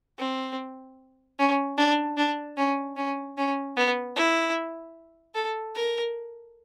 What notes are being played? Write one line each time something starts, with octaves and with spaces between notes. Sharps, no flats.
C4
C#4
D4
D4
C#4
C#4
C#4
B3
E4
A4
A#4